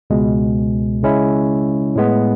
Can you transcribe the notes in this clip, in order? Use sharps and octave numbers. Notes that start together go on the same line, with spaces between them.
C#2 B2 G#3
C#3 G#3 C#4 E4
A2 G#3 B3